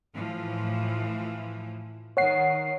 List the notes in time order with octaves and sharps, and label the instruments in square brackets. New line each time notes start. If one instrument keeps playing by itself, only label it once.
[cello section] A2 E3 F3
[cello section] D#3 [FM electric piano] C#5 F#5 C7